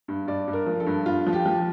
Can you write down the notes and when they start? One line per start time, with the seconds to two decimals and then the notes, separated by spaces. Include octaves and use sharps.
0.08 G2
0.27 G2 D5
0.48 G2
0.53 A#4
0.66 F3
0.80 A4
0.87 G2
1.06 G2 F4
1.27 F3
1.33 G4
1.46 F3